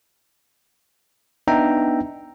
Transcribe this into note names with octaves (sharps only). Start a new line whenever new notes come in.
B3 D4 D#4 E5 G5 A#5